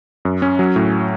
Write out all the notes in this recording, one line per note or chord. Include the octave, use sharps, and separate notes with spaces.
F#2
C#4
F#3
A2